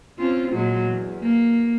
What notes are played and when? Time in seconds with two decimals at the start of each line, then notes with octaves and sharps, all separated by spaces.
0.19 C4 C#4 F4
0.52 A#2 F#3 G#3
0.87 E2
1.23 A#3